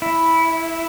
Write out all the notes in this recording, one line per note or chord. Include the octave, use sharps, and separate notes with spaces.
E4